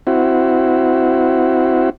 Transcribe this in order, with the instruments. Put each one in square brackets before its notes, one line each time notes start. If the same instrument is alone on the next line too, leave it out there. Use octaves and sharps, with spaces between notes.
[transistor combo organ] C4 E4 F#4